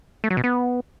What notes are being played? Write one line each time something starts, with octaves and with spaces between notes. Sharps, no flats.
A3
F#3
B2
B3